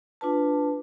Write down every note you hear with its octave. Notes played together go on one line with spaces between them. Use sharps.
D4 F4 B4 A5